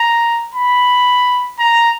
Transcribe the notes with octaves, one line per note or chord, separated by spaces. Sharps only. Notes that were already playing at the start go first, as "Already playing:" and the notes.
Already playing: A#5
B5
A#5